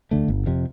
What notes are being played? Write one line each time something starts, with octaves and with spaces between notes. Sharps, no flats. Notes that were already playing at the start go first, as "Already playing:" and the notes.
D2 D3 A3
G1
F2 C3